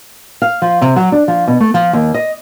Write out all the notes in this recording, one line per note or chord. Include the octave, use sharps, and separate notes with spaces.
F5
F3
C3
F#3
D4
F3
B2
A3
F3
D#2
D#5